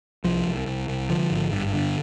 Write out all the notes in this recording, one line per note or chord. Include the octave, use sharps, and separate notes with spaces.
C2 F3
C2
C2
C2
D3 F3
G#1
G2
D3